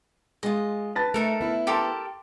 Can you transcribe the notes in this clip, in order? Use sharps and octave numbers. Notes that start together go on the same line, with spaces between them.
G#3 F4 D#5
B4 A5 A6
A3 D#4 A4 A#4
B3 E4
G4 A4 A#4 A5 C6 D6